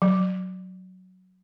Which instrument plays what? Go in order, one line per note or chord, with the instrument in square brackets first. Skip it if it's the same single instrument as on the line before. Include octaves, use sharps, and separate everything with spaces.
[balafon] F#3